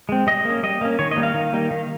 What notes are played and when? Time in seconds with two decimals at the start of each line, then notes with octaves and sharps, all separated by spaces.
0.09 G#3 C4
0.27 G3 D#5
0.45 A#3
0.50 C#4
0.63 G3 D#5
0.81 A#3 C#4
0.99 D#3 C#5
1.11 D#5
1.16 G3 A#3 D#4
1.23 F5
1.34 D#3
1.53 G3 A#3 D#4
1.71 D#3